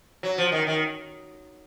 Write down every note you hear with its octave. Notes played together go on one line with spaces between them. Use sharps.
F#3
F3
D#3
D#3